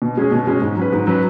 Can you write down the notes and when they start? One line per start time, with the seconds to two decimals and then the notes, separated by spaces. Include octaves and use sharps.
0.02 B2
0.17 G#3 C#4 G#4
0.32 B2
0.47 G#3 C#4 G#4
0.62 G#2
0.77 F#3 C#4 B4
0.92 G#2
1.07 F#3 C#4 B4